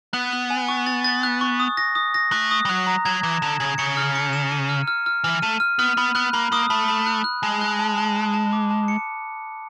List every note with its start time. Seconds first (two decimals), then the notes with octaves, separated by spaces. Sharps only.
0.13 B3 F#6
0.33 F#6
0.50 G#5
0.68 C#6
0.86 A6
1.04 A6
1.23 F#6
1.41 C#6
1.60 D#6
1.77 A#6
1.95 D#6
2.14 A#6
2.32 A3 F#6
2.51 D#6
2.65 G3
2.69 F#3 F#6
2.87 A#5
3.05 F#3 G#6
3.23 E3 E7
3.42 D3 E7
3.60 C#3 G#6
3.78 C#3 C#7
3.97 F6
4.15 C#7
4.33 E7
4.51 D#7
4.69 F6
4.88 F6
5.06 F6
5.24 E3 F6
5.42 A3 D#7
5.60 F6
5.79 B3 F6
5.97 B3 B5
6.15 B3 F#6
6.33 A#3 B5
6.52 A#3 D#6
6.70 A3 B5
6.88 B5
7.06 F#6
7.24 F#6
7.43 G#3 A5
7.61 F#6
7.79 A5
7.98 A5
8.16 A5
8.34 A5
8.53 D6
8.71 A5
8.88 C#7